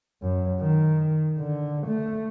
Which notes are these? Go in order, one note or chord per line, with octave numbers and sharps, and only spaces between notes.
F#2
D#3
D3
A3